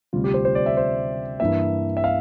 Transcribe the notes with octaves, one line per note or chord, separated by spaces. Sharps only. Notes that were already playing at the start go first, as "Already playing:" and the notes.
D2 C3 G3 F4
G4
C5
C5
D5
E5
C5
G2 E3 A#3 E5
E5
F5